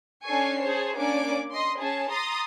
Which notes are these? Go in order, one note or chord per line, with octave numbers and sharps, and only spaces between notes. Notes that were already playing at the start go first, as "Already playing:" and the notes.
C#4 D4 A4 G#5 C#6 C7
G#4 C5 C#5 A5
A#3 C#4 D4 D5 D6
D#5 C6
C#4 G#4 A5
A#5 C6 D#6 A6